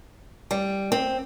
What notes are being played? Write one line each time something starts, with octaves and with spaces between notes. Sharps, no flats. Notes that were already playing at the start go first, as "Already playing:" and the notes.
G3
C4